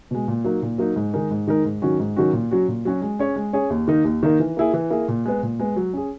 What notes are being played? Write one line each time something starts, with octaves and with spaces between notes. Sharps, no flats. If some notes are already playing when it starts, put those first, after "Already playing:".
B2 G#3
A#2
F#3 A#3 D#4
A#2
F#3 A#3 D#4
G#2
D#3 G#3 D#4 A#4
G#2
D#3 G#3 D#4 A#4
G#2
D#3 F#3 C#4 F#4
G#2
D#3 F#3 C#4 F#4
A#2
F#3 C#4 F#4
A#2
F#3 C#4 F#4
G#3
C#4 G#4 C#5
G#3
C#4 G#4 C#5
D#2
D#3 A#3 D#4
D#2
D#3 A#3 D#4
E3
A#3 E4 G#4
E3
A#3 E4 G#4
A#2
G#3 B3
A#2
G#3 B3
F#3
C#4 G#4